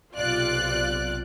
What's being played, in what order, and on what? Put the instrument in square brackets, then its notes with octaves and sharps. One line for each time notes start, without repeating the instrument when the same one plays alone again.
[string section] B1 C3 F4 D5 F#6